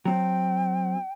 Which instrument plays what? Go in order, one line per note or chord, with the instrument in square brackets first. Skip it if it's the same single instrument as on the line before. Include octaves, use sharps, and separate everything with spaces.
[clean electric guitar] F#3 C4 [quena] G5